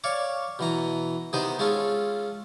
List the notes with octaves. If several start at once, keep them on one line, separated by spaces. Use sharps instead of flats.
C#5 D5 F5 C#6
B2 E3 A#5
C3 D#3 B3 C5 D#5
G#3 C#4 F4 A4